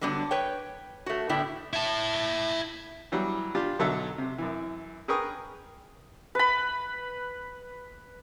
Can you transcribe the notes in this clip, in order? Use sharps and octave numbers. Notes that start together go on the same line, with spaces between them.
D3 F#3 G3 B3 D4
B4 C#5 G5
A3 F#4
A2 D3 B3 D4 E4 G5
E4 A5
E3 F#3 G3
D4 F4 G4
B1 D3 F#3 D#4 A4 E5
C3
F#2 E3
G#4 A#4 B4 G5 C#6 D#6
B4 B5